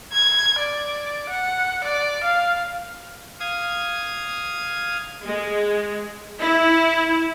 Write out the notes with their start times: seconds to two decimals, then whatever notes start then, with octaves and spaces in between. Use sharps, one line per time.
0.12 G#6
0.59 D5
1.29 F#5
1.84 D5
2.24 F5
3.40 F5 D#6 G#6
5.25 G#3
6.40 E4